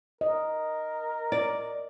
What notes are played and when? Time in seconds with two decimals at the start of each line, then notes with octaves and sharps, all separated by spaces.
0.21 A#4 D#5
1.32 D5